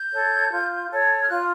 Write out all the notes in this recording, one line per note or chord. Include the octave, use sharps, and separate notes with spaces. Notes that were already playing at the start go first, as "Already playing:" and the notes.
Already playing: G6
A4 C#5
F4
A4 C#5
F6
F4 F#6